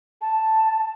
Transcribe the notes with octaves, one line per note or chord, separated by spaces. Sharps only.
A5